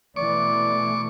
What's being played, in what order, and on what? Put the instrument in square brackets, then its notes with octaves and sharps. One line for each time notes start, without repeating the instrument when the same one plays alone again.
[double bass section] B2 E3 A3 [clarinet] D5 [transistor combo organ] C#6 D6